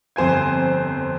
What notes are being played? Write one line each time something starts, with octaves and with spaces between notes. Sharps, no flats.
G1 F2 C5 G#5 G#6